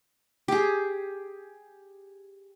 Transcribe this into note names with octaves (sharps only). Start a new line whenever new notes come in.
G4 G#4